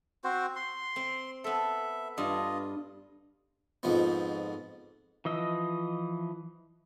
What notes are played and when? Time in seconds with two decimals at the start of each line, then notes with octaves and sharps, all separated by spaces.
0.24 C4 F#4 C5
0.56 C6
0.96 C4
1.44 B3 A4 E5
2.18 G2 F4 D#5
3.83 F2 G#2 F3 B3
5.25 E3 F3 D#5 E6